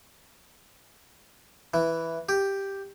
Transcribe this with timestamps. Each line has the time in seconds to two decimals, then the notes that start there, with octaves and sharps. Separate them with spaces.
1.74 E3
2.29 G4